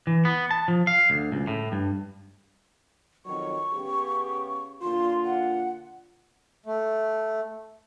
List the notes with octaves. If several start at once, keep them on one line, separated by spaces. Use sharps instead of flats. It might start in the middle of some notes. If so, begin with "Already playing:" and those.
E3
B3
A5
F3
F5
D2
C#2
A2
G2
F2 D#3 F#3 C#6
C#3 B3 G4
A#2 D3 F4 C6
F#5
A3